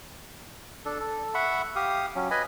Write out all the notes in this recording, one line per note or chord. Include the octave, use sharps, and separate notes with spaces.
D4 A4
A4
E5 F#5 B5 C#6
G4 F5 D#6
F#3 C#4
B4 D#5 G#5 B5